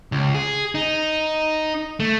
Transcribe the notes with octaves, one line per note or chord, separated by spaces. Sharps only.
C#2
G#4
D#4
A3